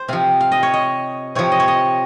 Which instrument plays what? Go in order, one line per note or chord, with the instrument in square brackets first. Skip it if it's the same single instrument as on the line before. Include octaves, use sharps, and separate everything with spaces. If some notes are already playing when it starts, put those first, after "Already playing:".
Already playing: [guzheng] C5
C3 F3 F5
F5
D#5
C#5
D#5
C3 F3 C#5
D#5
C#5
D#5